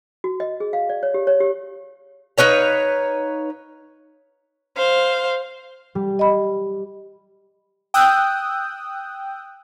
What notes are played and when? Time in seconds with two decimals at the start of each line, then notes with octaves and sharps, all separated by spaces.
0.24 F#4
0.40 D#5
0.60 G#4
0.73 F5
0.89 D5
1.03 C#5
1.14 G4
1.27 C#5
1.40 G4
2.38 D#4 B4 C#5 F5
4.77 C5 F5
5.95 G3
6.19 D#5 B5
7.94 G5 D#6 E6 F#6 G6